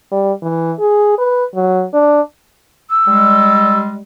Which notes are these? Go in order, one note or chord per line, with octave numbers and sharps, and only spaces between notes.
G3
E3
G#4
B4
F#3
D4
E6
G3 G#3